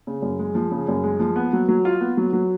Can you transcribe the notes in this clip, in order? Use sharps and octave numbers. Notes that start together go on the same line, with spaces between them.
C#3
F#2
G#3
F3
C#3
F#2
G#3
F3
B3
F#3
F#3
F4
B3
F#3
F#3